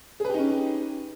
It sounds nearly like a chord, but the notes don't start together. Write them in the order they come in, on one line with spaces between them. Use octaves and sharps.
G#4 B4 G4 D#4 C#4